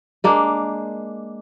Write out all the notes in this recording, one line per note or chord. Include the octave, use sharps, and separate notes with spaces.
G#3 A#3 D4